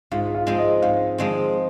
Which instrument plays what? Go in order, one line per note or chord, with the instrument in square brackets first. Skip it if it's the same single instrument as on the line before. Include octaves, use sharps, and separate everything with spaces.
[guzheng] G#2 [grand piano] F4
[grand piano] F4
[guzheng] F3 G#3 C4
[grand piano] D#5
[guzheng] G#2 [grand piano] F5
[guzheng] F3 G#3 C4